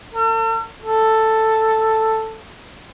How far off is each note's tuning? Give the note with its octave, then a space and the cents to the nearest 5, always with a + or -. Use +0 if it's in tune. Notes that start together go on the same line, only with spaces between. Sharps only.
A4 +45
A4 +5